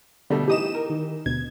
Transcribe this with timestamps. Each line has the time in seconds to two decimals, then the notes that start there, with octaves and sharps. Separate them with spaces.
0.30 B2 D3 G3 A3
0.48 E3 D#4 G4 D#6 E7
0.75 A#4
0.90 D#3
1.26 D2 B2 G#6